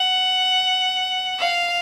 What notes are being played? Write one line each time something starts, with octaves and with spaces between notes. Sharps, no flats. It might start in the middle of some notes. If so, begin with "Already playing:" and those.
Already playing: F#5
F5